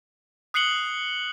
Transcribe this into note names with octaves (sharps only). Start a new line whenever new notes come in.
D#6 F#6 C7 C#7 F#7 G7